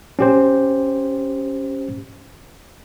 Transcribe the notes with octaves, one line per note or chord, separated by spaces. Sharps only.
C#4 G4 C5